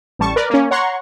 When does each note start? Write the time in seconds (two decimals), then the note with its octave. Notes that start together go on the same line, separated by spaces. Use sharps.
0.19 A1 G3 A5 C#6
0.36 A#4 B4 D5
0.50 A#3 C#4
0.71 C#5 F#5 A#5 C6 C#6